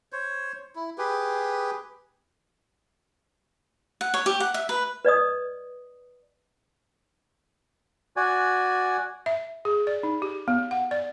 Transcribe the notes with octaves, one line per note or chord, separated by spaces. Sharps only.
C5 C#5
E4
G4 G#4 B4
F#5
C#5
G4
F#5
E5
B4
B4 D5 D#5 D#6
F#4 D5 G#5
E5
G#4
D5
D#4
G4
B3
F#5
D5